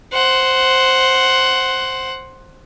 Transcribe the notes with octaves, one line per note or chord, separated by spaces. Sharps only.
C5 F#5